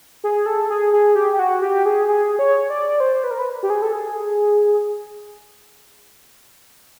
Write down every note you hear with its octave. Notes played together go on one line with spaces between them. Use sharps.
G#4
A4
G#4
G#4
G4
G4
F#4
G4
G#4
G#4
C#5
D5
C5
B4
A#4
B4
G4
G#4
A4
G#4